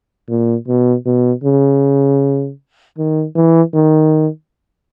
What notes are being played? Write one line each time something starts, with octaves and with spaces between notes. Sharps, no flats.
A#2
B2
B2
C#3
D#3
E3
D#3